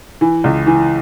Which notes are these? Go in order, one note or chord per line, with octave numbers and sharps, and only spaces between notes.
E3
C#2
E3